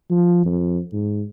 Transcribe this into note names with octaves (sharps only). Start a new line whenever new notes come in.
F3
F2
G#2